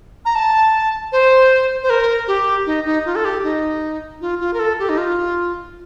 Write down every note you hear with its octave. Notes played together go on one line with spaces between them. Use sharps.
A#5
A5
C5
C5
A#4
G4
D#4
D#4
F4
A4
G4
D#4
F4
F4
A#4
A4
G4
D#4
F4